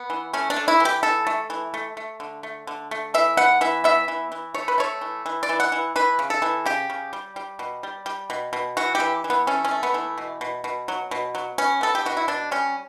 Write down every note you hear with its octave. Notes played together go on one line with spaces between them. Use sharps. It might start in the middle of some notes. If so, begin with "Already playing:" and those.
Already playing: B3
E3
A3 C#4
D4
A3
E4
E3
G4
E3 A4
A3
E3
A3
A3
D3
A3
D3
A3
E3 E5
B3 F#5
E3 E5
B3 E5
E3
E3
A3 C#5
B4
A3 C#5
E3
E3
D5
E3
F#5
E3
E3 B4
C#3
A4
E3
C#3 G4
C#3
G3
G3
B2
G3
G3
B2
B2
E3 F#4
G4
E3
E3
B3
A3 C#4
C#4
A3
B3
E3
B2
B2
B2
F#3
B2
F#3
B3 C#4
B3 A4
G4
B2 F#4
E4
B2 D4
G3 C#4